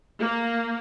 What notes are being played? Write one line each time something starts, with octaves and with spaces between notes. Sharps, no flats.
A#3